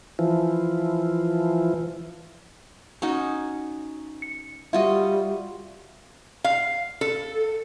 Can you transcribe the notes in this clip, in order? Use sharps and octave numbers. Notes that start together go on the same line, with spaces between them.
E3 F3
C#4 D#4 F#4
C#7
G3 F4 F#4 D#5 E5
F5
A4